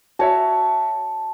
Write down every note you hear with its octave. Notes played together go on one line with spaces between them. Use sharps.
F#4 C#5 E5 A5